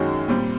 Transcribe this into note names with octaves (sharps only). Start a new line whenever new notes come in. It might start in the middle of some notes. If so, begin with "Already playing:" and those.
Already playing: F#2 D#3 G#3 C#4 F#4
A#2 G3 C4